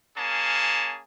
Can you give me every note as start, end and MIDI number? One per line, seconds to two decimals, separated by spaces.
0.16 1.00 58
0.16 1.00 61
0.16 1.00 68
0.16 1.00 81